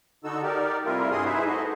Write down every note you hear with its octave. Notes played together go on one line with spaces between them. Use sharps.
D3 D#4 F#4 A4 E6
D#4 G4 A#4 D5
C3 G3 A3 E4 F4 A#4
G2 E4 F#4 G#4 C6 D#6
D#4 E4 G#4 B4 C5 E5
A3 D#4 F#4 D#5